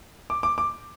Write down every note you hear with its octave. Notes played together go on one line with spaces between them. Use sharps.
D6
D6
D6